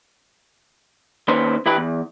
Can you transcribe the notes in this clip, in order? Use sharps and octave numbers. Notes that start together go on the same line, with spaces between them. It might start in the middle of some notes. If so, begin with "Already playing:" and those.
D#2 C#4 B4 C5
E3 E4 G4 B4
E2